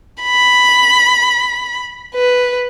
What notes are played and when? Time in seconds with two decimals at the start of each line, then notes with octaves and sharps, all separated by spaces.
0.23 B5
2.14 B4